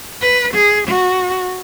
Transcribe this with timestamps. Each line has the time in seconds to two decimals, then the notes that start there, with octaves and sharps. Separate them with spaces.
0.21 B4
0.54 G#4
0.88 F#4